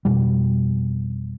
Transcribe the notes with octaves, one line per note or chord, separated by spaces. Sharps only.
F2 B2 G3